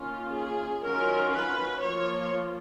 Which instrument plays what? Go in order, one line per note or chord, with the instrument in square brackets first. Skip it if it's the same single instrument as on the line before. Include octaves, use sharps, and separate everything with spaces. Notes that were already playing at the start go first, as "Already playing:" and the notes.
Already playing: [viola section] D#3 A#3 C#4 F4
G#4
D#3 F#3 C#4 F4 A#4
B4
F3 A#3 F4 C#5